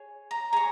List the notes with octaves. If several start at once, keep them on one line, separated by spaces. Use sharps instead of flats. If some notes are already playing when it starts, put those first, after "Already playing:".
Already playing: G#4 C#5
A#5
G#4 C#5 A#5